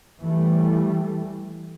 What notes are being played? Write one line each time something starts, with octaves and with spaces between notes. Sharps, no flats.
E3 G3 A3